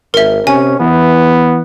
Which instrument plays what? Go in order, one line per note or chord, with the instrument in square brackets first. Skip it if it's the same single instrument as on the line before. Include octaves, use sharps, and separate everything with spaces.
[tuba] G#1 [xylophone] A#4 E5
[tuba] C3 [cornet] C#4 [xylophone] G#5
[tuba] E3 [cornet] B3